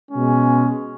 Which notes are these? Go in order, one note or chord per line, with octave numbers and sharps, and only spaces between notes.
B2 G#3 C#4